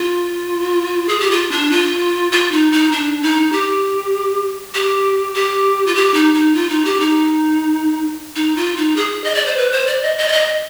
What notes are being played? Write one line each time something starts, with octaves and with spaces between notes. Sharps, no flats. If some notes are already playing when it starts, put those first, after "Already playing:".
Already playing: F4
G#4
G4
F4
D4
F4
F4
D#4
D#4
D4
D#4
G4
G4
G4
F4
G4
D#4
D#4
F4
D#4
G4
D#4
D#4
F4
D#4
G#4
D#5
D5
C5
B4
C5
D5
D#5
D#5
D5
D#5